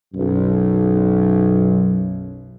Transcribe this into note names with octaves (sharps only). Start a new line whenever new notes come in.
B1 F#2